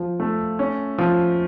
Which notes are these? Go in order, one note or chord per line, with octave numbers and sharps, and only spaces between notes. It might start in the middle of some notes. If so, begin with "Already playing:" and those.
Already playing: F3
A3
C#4
F3